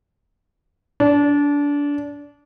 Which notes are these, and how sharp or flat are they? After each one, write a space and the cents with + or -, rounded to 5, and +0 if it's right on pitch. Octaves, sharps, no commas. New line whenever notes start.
D4 -25